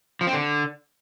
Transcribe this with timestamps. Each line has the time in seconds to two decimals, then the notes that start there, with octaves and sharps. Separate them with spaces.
0.21 F3
0.27 C4
0.33 D3